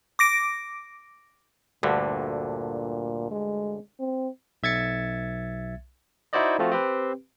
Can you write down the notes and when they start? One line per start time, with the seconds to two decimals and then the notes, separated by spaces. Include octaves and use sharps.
0.19 D6 A#6 D7
1.83 D2 G2 A#2 D3
3.31 G#3
3.99 C4
4.63 B1 E5 G#6 A6 C#7
6.33 D#4 E4 F#4 C5 D5 D#5
6.59 F3 A3 C4 F4 F#4
6.72 C4 G4 B4